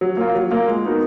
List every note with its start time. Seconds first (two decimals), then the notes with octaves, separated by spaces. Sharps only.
0.01 F#3
0.17 A#3 F4
0.35 F#3
0.51 A#3 F4
0.67 G#3
0.85 B3 D#4 F#4 A#4